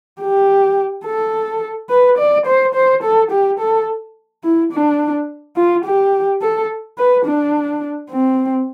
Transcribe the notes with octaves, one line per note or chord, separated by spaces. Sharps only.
G4
A4
B4
D5
C5
C5
A4
G4
A4
E4
D4
F4
G4
A4
B4
D4
C4